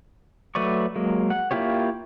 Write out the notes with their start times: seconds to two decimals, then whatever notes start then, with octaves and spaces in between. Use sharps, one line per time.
0.55 F#3 A3 B4 D5 C#6
0.96 F#3 G#3 A#3
1.30 F#5
1.51 A#3 E4 F4 G4 C#5